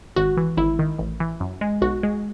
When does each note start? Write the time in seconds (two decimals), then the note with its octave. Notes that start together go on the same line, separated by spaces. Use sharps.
0.16 G#1 F#4
0.37 E3
0.57 G#1 E4
0.79 D#3
0.99 A1
1.20 E3
1.40 F#2
1.61 G#3
1.82 B1 F#4
2.03 G#3